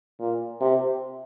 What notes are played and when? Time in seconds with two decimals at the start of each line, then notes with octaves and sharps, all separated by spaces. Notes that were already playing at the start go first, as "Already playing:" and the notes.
0.20 A#2
0.61 C3